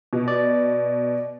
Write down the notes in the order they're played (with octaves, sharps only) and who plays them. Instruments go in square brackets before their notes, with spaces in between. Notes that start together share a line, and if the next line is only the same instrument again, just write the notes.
[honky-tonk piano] B2
[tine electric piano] D5